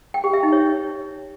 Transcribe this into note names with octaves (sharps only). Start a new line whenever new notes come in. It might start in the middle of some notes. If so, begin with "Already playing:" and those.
G5
G4
E5
D#4
C#5